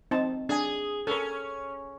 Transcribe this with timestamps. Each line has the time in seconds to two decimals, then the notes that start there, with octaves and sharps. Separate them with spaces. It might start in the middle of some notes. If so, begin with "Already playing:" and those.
0.11 C4 D#4 A5
0.49 D4 G#4 G#5
1.07 C#4 A4 A#4